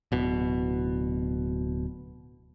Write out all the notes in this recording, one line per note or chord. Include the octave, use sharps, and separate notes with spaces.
D1 B2